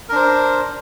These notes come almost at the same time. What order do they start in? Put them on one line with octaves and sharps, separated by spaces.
A#4 D4 C5